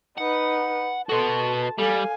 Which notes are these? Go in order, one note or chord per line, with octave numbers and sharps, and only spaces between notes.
D#4 B4 F#5
B3 F#4 A4 A5 C6
G3 A4 F5 G#5